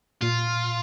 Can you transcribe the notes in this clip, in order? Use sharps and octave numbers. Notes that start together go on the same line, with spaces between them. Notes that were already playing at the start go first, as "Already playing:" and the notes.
A#2 F4